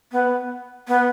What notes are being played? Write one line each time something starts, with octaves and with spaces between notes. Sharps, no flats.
B3
B3